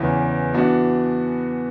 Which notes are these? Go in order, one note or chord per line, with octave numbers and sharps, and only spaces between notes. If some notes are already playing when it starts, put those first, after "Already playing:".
Already playing: E2 C#3 E3
E3 B3 D4 F#4